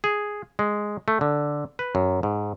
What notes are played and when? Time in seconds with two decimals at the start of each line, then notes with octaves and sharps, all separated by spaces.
0.04 G#4
0.59 G#3
1.08 A3
1.21 D3
1.79 B4
1.95 F#2
2.23 G#2